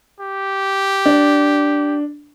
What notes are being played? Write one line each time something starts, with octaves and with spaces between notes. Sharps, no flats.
G4
D4